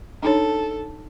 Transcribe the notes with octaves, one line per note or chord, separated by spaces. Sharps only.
D4 D#4 A4 C#5